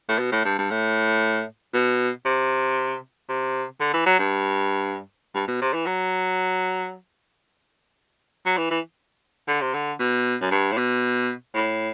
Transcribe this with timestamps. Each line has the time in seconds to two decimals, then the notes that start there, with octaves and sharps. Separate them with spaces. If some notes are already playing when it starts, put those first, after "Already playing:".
0.08 A2
0.19 B2
0.32 A2
0.45 G2
0.58 G2
0.71 A2
1.73 B2
2.25 C3
3.29 C3
3.80 D3
3.93 E3
4.06 F#3
4.19 G2
5.35 G2
5.47 B2
5.61 C3
5.73 E3
5.86 F#3
8.45 F#3
8.57 E3
8.70 E3
9.47 D3
9.61 C3
9.74 D3
9.99 B2
10.40 F#2
10.51 G2
10.72 A2
10.77 B2
11.54 A2